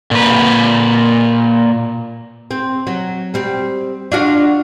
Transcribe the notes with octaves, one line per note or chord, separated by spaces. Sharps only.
A#2 B4
C4
F#3
G3 C4
D4 F4 F#4